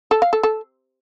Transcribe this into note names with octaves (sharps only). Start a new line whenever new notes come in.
A4
F5
A4
A4